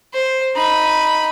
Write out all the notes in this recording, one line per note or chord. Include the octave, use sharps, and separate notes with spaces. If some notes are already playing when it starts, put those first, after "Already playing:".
C5
D#4 B5